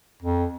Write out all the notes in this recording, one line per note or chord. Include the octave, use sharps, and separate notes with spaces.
F2